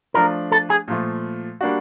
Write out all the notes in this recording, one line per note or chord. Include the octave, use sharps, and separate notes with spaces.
F3 A3 D4 F4 A#4
A4
G#4
A#2 F3 A3
G3 A#3 D4 F#4